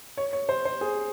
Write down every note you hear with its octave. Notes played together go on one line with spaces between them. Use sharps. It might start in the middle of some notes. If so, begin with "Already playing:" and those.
C#5
C#5
C5
C5
G#4